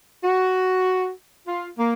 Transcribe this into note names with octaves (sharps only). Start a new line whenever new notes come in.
F#4
F4
A#3